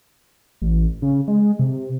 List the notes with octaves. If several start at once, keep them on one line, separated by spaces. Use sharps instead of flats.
A1
C#3
G#3
C3